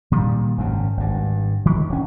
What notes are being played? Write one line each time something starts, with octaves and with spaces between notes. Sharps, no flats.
A#2 D#3 G3
G#1 F#2 C#3
G#1 G2
D#3
E1 C#4